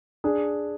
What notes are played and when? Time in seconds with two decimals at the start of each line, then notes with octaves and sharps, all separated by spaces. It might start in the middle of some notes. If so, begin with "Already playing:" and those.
0.24 D4 G#4